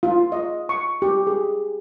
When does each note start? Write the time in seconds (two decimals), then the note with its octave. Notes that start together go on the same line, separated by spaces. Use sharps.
0.03 F4
0.32 D#5
0.69 C#6
1.02 G4
1.27 G#4